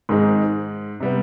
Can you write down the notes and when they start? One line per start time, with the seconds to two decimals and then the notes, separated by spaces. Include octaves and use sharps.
0.09 G#2 D#3 G#3 C4 D#4
1.00 C3 G3 B3